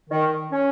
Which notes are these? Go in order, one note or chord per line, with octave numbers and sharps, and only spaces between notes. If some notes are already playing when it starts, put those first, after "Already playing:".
D#3
C#4